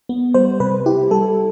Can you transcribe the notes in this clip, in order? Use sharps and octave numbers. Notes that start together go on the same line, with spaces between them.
B3
G3 C5
C3 B4
E4 G4
G3 A4